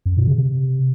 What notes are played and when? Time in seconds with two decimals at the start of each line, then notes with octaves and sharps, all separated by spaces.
0.06 F#2
0.16 B2
0.27 C#3
0.38 C3